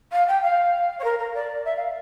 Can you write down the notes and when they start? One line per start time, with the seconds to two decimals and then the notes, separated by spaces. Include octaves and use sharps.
0.12 F5
0.28 G5
0.43 F5
0.99 C#5
1.04 A#4
1.19 A#4
1.34 D5
1.65 E5
1.76 F5